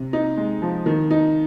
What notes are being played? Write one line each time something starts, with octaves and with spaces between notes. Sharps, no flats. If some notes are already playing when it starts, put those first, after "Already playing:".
Already playing: C3
D#4
G#3
F3
D#3
D#4